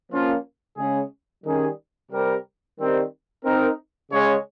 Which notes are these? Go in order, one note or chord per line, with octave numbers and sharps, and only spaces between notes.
F3 A#3 C#4 F4
C#3 G#3 C#4 G#4
D#3 G3 C#4 G#4
C3 G3 C4 G4 A#4
D#3 G3 C4
C4 D#4 A#4
C#3 G#3 C#4 G#4 C#5